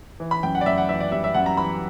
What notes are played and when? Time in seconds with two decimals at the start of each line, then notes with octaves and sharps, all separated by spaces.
0.20 E3
0.31 B5
0.43 F#2 G5
0.55 F#5
0.61 D5
0.66 F#2 E5
0.78 F#5
0.89 E3 E5
1.00 D5
1.12 G3 E5
1.24 E5
1.34 F#2 F#5
1.46 A#5
1.57 E3 B5